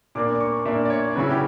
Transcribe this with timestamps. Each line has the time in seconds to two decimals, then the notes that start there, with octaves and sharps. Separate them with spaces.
0.15 A#2 A#3 D4 D6
0.35 D6
0.40 C#6
0.65 A#2 A#3 D4 E5
0.85 D5
0.90 C#5
1.16 C#3 F#3 C#4 E4 B4
1.31 G4